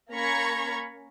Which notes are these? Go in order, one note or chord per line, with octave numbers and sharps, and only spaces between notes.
A#3 C#4 A#5 B5 C#6 G#6